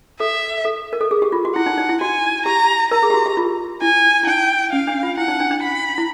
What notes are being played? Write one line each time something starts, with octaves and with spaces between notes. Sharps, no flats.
A4 E5
A4
A#4
A4
G#4
G4
F4
F#4
E4 F#5
D#4
D#4
E4
F#4 G#5
G4 A#5
A#4 A#5
G#4
G4
F#4
G4
F4
E4 G#5
E4
D#4 G5
C#4 F5
D4
F4
E4 F#5
D#4
D4
D4
B5
E4